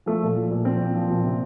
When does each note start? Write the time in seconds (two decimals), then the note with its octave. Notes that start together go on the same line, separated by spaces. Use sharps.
0.06 F3 A3
0.22 A#2
0.36 F3
0.51 A#2
0.65 F3 C4
0.80 A#2
0.95 F3
1.10 A#2
1.24 C3